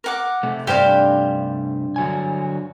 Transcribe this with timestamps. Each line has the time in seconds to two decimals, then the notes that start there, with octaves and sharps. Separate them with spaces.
0.04 A#4 F#5 D6
0.43 C3 A3
0.67 G2 G4 C5 F5
1.96 D3 F#3 G#5